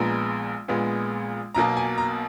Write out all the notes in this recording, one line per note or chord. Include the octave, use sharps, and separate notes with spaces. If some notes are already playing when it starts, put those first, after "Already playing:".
Already playing: A#1 A#2 G#3 B3 A#5
A#1 A#2 G#3 B3
B1 B2 A#3 A#5
G#5
A#5